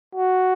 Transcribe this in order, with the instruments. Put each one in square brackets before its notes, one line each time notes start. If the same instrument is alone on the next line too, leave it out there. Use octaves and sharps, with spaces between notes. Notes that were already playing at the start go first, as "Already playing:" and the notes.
[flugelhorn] F#4